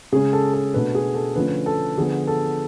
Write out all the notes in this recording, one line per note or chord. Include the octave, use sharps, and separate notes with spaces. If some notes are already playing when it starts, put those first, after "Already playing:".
C#3 G#3 C#4 G#4
A4
A4
B2 A3 D4 B4
G#4
A4
D3 F3 A3 C#4 B4
A4
D3 F3 B3 G#4
A4